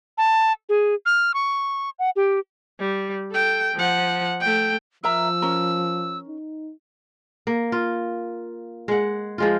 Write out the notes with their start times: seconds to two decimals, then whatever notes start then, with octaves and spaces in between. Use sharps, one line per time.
0.18 A5
0.69 G#4
1.06 F6
1.34 C#6
1.99 F#5
2.16 G4
2.79 G3
3.31 A4 G5
3.74 F3 F#5
4.40 A3 G5
5.04 F3 A#4 E5 A#5 E6
5.42 C#4 A#4
6.29 D#4
7.47 A#3
7.72 F4
8.88 G#3 F#5
9.38 F3 G#3 F4